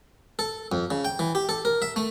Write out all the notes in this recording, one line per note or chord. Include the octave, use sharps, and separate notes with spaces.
A4
F2
C#3
G5
E3
G4
A4
A#4
E5
A3